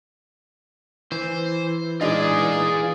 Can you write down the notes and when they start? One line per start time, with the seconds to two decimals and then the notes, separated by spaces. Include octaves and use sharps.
1.12 E3 C5
2.01 G#3 D4 D#4 F4 G#4 D5